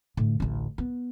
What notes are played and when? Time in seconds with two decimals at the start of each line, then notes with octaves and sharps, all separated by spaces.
0.17 A2 D3
0.40 A1 D2
0.78 B3